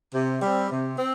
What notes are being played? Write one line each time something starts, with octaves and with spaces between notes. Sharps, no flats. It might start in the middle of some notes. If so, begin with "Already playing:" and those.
C3
G3 C4
C3
C4